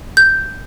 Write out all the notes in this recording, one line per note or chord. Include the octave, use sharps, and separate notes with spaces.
G6